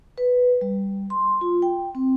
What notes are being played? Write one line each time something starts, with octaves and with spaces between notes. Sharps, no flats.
B4
G3
C6
F4
G5
C4